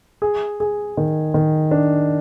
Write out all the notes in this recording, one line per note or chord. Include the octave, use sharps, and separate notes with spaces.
G#4
G#4
D#3
D#3
D4